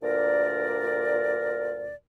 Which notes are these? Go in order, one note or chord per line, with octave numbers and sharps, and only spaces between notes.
D2 G2 A#2 A#4 D5